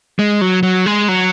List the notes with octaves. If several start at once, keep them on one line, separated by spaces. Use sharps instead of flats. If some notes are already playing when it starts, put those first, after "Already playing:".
G#3
F#3
F#3
G#3
F#3